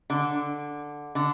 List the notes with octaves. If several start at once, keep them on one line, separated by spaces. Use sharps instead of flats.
D3
D3